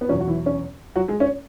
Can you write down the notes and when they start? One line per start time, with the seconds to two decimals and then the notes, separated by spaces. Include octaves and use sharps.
0.01 B3
0.08 E2 B2 F#3 C#4
0.20 F#4
0.27 E3 E4
0.46 C#4
0.96 F#3 F#4
1.08 G#3 G#4
1.20 C#4 C#5